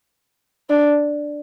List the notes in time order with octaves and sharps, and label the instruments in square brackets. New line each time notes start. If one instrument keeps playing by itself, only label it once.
[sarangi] D4